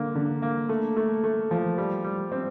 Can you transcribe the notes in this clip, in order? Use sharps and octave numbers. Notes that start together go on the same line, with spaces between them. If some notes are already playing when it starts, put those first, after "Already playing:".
Already playing: D3 A#3
D3
A#3
A3
A3
A3
F3
G3
G3
C4